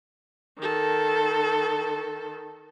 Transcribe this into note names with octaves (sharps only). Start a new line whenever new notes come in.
D#3 A4